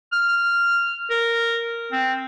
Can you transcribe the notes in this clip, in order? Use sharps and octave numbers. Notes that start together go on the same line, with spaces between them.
F6
A#4
C4